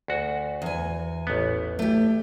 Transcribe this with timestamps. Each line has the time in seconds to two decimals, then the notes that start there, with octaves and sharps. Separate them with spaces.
0.08 D2 F#4
0.62 E2 G#5
1.27 A1 B3
1.79 A3 G4